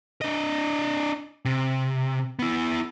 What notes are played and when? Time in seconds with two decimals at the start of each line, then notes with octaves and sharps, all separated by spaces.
0.22 D4 D#5
1.45 C3
2.39 B3 E4